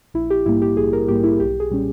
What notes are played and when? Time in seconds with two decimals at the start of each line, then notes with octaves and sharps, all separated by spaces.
0.14 A#1 E4
0.30 G4
0.46 G#2 G3 A#3 E4
0.62 G4
0.77 A#1 G#4
0.93 A#4
1.08 G#2 G3 A#3 G4
1.24 E4
1.40 B1 G4
1.60 G#4
1.71 A#2 G3 C#4